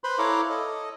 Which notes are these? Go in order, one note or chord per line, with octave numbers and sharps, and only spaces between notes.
B4 C5 B5 C6
E4 A4 C#5 F5 A#5 D6
A4 D#5